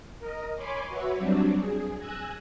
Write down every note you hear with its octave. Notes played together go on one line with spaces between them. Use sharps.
A#4 D#5
C#5 G#5 B5 C6 D6
F#4 B4 C#5 E5
F#3 G3 C4 D4
G#4
G#5 E6 F#6 G#6 A#6